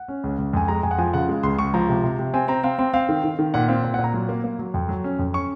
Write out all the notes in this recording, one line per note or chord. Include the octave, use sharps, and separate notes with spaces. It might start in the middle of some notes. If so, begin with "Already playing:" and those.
Already playing: F#5
C#4
C#2
C#2
F2 G#5
G#3 A#5
F2 G#5
F#5
F3 G#5
C#3 F#5
G#3
C#2 C6
C#2 C#6
F3 A#5
C3
C3
C3
C4 G#5
C4 A#5
C4 F5
C4
C4 F5
D#3
D#3
D#3
A#2 F#5
C4 F5
A#2
F#5
A#2
A#5
F#3
A#3
A#3
F#3
F2
F#3
C#4
F2
C#4 C#6